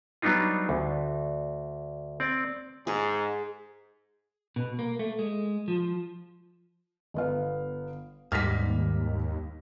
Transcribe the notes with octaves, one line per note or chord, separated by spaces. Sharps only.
F#3 G3 B3 D4 D#4 F4
D2
C4 D5
G#2 G#4
B2
A#3
A3
G#3
F3
G1 B3 F5
D#2 G#2 G3 F6 A#6 B6